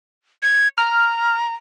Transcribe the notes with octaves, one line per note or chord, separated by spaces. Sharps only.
G#6
A#5 F6